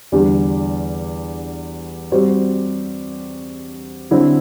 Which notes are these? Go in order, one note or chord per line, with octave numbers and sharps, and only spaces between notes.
E2 D3 G3
G3 C4 F#4 C5
D3 F#3 C4 E4